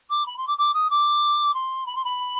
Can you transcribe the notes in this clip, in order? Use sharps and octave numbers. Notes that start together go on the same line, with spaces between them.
D6
B5
C6
D6
D6
D#6
D6
C6
B5
C6
B5